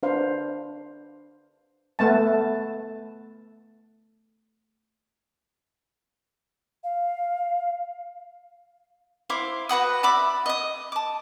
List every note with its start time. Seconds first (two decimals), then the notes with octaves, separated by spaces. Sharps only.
0.03 D4 B4 C5 F5 C6
1.99 A3 B3 A5
6.84 F5
9.30 E4 C5 F5 D6
9.69 F#4 B4 F#5 D#6
10.03 D5 E5 B5 D6
10.46 D#5 D#6
10.92 A5 D6